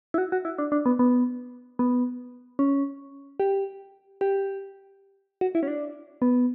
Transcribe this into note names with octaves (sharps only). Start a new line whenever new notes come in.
E4
F#4
F#4
E4
D4
D4
B3
B3
B3
C#4
G4
G4
F#4
E4
C#4
D4
B3